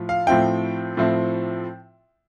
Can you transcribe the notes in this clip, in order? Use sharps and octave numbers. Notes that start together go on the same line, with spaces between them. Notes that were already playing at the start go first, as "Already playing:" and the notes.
Already playing: A2 F3
F5
A2 F3 C4 E4 G5
A2 F3 C4 E4